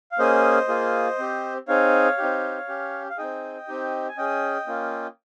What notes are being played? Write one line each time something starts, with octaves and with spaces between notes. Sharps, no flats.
F5
A#3 C#4 G#4 C5 D#5
A#3 F4 G#4
C4 G4
C4 D#4 G#4 C#5 F5
C4 D#4 G4
C#4 G4
F5
C4 D#4 G#4 D#5 G5
C4 D#4 G4
G#5
C#4 G#4 D#5 G5
A#3 C#4 F4